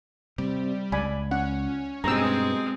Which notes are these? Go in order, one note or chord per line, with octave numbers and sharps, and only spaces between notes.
C3 G3
C#2 D5 G#5 B5
C#4 F#5
G2 B2 G#3 C4 A#5 E6